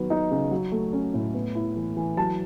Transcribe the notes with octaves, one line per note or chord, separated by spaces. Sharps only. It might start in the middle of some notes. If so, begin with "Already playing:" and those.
Already playing: D#3 F#3 B3
D#4
C#3
F#3
A3
C#4
A2
B3
E4
E3
E3
F#3 A5